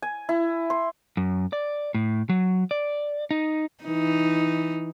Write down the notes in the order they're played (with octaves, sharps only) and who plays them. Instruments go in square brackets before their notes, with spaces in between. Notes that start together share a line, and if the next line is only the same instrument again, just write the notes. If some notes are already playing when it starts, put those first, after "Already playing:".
[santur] G#5
E4
C6
[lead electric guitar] F#2
D5
A2
F#3
D5
D#4
[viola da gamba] E3 D#4